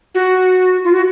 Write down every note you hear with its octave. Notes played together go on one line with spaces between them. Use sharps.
F#4
F4
F#4